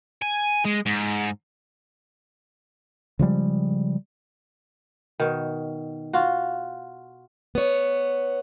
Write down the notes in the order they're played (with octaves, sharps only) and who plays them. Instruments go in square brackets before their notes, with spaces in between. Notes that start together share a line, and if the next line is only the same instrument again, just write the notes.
[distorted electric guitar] G#5
G#3
G#2
[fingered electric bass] C#3 F3 G3 G#3
[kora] B2 D#3
F4 F#4
[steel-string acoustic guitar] B3 C#5